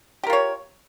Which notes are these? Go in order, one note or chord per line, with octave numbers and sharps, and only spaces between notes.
F4 G4 A#4 C#5